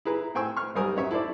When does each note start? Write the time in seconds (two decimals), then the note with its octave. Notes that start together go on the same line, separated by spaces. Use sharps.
0.05 E4 G#4 B4 A#5
0.35 A2 C4 G5 G#5 C#6 E6
0.57 C#6 F6
0.76 B1 G3 C4 A#4 G#5 D#6
0.96 F#3 C#4 C#5 E5
1.11 E4 A4 C5 D5